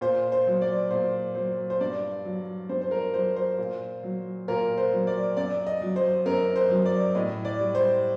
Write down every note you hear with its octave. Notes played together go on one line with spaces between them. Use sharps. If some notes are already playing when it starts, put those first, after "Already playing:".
A#2 C5
C5
F#3
D5
A#2 C5
F#3 C5
C5
G2 D5
F#3
G2 C5
C5
A#4
F#3 C5
C5
A#2
F#3
A#2 A#4
C5
F#3
D5
F#2 D5
D#5
F#3
C5
F#2 A#4
C5
F#3
D5
A2 D#5
D5
G3
C5